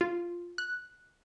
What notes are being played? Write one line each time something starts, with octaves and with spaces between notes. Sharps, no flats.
F4
F#6